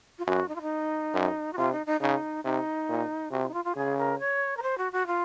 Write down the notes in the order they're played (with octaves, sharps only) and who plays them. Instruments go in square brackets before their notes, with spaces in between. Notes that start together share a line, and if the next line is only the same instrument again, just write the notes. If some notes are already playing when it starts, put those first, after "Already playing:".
[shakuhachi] F4
[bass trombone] F#2 [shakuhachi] F#4
[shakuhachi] D#4
F4
D#4
[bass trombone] F#2
[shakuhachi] F#4
[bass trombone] C3 [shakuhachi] F4
[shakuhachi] D#4
D#4
[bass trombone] C#3 [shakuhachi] D#4
[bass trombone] C3 [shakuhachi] D#4
[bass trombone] A#2
[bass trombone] C3 [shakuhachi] F#4
[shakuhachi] F4
D#4
F4
F4
[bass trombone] C#3 [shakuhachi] G#4
[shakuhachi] A#4
C#5
A#4
C5
F#4
F#4
F4